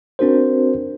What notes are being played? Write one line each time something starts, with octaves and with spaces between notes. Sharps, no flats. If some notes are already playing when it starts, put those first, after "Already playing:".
C4 D4 F#4 A#4 C5